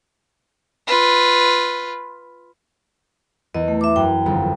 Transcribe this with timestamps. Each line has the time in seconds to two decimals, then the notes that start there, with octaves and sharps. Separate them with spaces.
0.87 F4 B4
3.54 E2 D#5
3.68 A3
3.81 E5 D6
3.96 F#2 G5
4.26 G1 F2